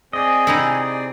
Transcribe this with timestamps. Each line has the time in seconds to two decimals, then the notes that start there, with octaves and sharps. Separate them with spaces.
0.13 C4 G#4 D5 D#5 G#5
0.47 C3 D#4 E4